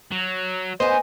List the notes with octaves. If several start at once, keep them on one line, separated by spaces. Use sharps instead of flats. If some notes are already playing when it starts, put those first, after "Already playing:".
F#3
B3 C5 D#5 G#5